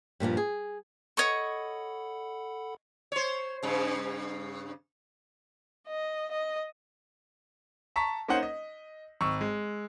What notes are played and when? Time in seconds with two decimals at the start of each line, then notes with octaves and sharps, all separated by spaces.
0.20 G2 A#2 E3 F3
0.37 G#4
1.17 A4 C#5 D#5 F#5 B5 C#6
3.12 C5 C#5
3.63 G2 C#3
5.88 D#5
6.31 D#5
7.96 A5 A#5 C#6 B6
8.28 A#3 C#4 D#4 C5 F#5
8.43 D#5
9.21 G#1 C#6 E6
9.41 G#3